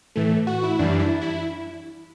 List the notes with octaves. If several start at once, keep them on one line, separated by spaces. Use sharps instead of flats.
A2 E3 A3
F#4
E4
F#2 E3 G3 D4
E4
E4